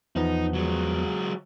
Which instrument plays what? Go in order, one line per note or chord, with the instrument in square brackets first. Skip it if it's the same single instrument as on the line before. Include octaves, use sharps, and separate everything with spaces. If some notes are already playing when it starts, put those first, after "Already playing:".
[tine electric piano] E2 F3 B3 [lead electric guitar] D#4
[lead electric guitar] F#3 G#3